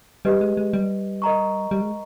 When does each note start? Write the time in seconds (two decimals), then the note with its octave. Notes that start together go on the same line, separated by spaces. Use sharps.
0.25 G3 G4 B4 D#5
0.41 G#3
0.57 G#3
0.73 G3
1.22 A#4 D#5 A#5 C#6
1.71 G3
1.81 G#3